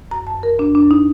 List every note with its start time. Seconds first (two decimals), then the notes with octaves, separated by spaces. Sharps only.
0.11 F#2 A#5
0.27 A5
0.35 F#2
0.43 A#4
0.58 F#2 D4
0.75 D4
0.82 F#2
0.91 D#4